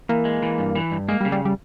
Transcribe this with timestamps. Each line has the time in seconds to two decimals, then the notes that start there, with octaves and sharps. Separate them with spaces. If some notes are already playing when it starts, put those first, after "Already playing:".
0.09 E3 A#3
0.25 G#3
0.43 E3
0.58 G2
0.76 E3
0.91 G2
1.09 G#3 A#3
1.21 G3
1.25 C#3
1.32 G3
1.45 G3